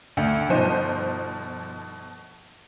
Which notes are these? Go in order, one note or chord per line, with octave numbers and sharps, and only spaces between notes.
D2
G1 B2 F3 D#4 C5 D#7